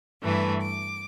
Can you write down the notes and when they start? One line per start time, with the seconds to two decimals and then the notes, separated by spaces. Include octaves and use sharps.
0.22 G2 E3 A3 B4
0.60 D6